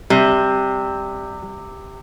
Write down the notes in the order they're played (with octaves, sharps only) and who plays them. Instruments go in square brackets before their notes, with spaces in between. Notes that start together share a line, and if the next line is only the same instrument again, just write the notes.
[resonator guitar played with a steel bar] C3 [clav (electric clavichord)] G3